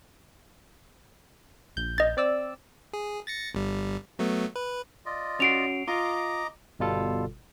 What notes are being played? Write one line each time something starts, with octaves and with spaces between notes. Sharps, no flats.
A#1 G6
D#5 A6
C4 D5 E6
G#4
A6 A#6 C#7
G1 G3
F#3 A3 B3
B4
F4 D5 D#5
C#4 F#4 C7 D7 F7
F4 D#5 A#5 D6
G1 B2 G3 F4 A4